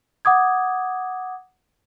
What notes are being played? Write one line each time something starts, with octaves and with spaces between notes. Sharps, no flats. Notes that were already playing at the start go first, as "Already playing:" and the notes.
F#5 D6 D#6 G#6